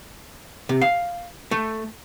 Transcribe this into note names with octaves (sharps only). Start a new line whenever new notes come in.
C3
F5
A3